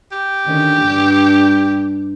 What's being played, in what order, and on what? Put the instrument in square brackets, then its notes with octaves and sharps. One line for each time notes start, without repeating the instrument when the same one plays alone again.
[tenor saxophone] G4
[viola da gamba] D3 D#3 C#4
G2 G3